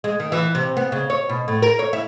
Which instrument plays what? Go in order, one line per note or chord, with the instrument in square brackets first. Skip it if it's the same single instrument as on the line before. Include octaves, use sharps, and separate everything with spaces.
[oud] G#3
D#3
E3
C3
B3
C#3
C#5
B2
A2
A#4
C#5
E4